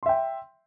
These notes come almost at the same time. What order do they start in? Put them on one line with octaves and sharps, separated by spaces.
C6 E5 G5